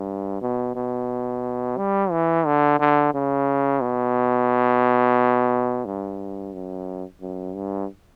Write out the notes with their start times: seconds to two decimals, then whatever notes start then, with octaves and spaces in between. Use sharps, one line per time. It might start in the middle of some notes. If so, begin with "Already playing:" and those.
Already playing: G2
0.42 B2
0.76 B2
1.77 G3
2.11 E3
2.46 D3
2.79 D3
3.14 C#3
3.82 B2
5.85 G2
6.53 F#2
7.21 F#2
7.55 G2